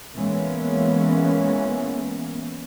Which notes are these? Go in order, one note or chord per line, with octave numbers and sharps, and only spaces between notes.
E3 G#3 A#3 B3 C#4